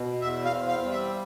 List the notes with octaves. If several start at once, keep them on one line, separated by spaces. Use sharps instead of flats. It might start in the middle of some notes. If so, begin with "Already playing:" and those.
Already playing: B2
E2 E5
F5
C4
F5
G3
E5